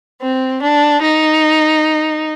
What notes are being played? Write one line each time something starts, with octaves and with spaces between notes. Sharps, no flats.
C4
D4
D#4